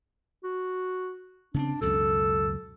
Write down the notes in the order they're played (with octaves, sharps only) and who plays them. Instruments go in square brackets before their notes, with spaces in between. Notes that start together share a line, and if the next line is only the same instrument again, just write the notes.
[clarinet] F#4
[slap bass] C#3 B3 C4 [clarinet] D4
[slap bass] C#2 F#2 B2 [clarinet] A4